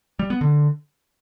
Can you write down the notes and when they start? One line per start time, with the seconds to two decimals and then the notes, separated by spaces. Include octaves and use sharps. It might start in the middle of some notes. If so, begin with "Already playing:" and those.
0.19 G3
0.30 B3
0.41 D3